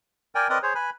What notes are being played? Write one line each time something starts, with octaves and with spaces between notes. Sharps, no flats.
A#4 D5 G5 G#5
C4 A#4 B4 D5 D#5 D#6
G#4 C5 C#5
B4 G#5 B5